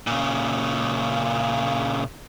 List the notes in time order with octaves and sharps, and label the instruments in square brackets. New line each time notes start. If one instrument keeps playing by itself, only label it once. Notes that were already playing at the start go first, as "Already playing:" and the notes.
[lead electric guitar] A#2 C#3